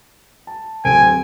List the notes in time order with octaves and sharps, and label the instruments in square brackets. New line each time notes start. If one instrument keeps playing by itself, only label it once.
[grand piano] A5
[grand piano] D1 C4 D7 [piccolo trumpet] G#5